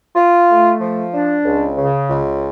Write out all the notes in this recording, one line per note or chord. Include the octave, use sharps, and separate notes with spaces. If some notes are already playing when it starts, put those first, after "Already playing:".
F4
A3
F3
D4
C#2
C#3
C#2